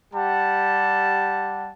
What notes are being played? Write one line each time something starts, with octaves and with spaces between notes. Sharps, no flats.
G3 G4 F#5 A5